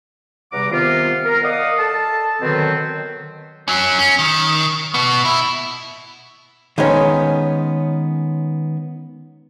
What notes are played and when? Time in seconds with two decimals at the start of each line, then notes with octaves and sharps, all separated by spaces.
0.52 E2 C3 G3 F#5 A#5 D6
0.71 C3 D#3 B3 F4
1.24 A#4
1.43 D5 D#5 F5 F#5 D#6
1.78 A4 A5
2.40 B2 D3 D#3 F#3 B3 C4
3.68 F#3 C#4
3.99 C#4
4.19 D#3
4.94 B2 B3
5.25 E4
6.78 D#3 G#3 B3 C#4